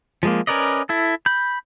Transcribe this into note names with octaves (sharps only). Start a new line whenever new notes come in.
F3 G#3 A#3
C#4 A#4 B4 D5 D#5
E4 A4
B5 G6